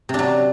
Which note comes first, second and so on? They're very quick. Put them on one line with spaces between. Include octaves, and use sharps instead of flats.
C3 D4 F#3